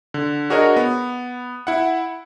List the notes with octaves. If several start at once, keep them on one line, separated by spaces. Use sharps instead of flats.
D3
D4 F#4 G#4 A#4 C#5 D#5
B3
E4 F#5